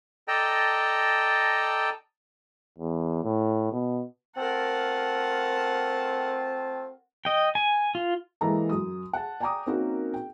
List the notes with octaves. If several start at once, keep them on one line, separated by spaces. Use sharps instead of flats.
A4 D5 D#5 G5 A5 A#5
E2
A2
B2
A3 C4 F4 A#4 F#5 A5
D#5 G5
G#5
F4
E3 G#3 A#3 A4 E5 A#5
F#2 D#6
F#5 A5
D5 G5 G#5 A#5 D6 D#6
A#3 C4 C#4 D#4 F#4 A#4
G5